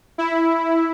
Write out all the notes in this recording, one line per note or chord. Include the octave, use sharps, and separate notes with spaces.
E4